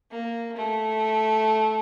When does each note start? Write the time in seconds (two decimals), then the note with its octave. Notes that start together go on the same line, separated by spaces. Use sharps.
0.11 A#3
0.56 A3